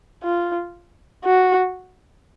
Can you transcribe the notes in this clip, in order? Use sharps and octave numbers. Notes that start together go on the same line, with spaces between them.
F4
F#4